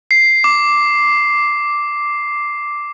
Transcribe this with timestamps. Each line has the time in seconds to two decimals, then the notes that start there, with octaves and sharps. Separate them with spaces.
0.11 C7
0.44 D6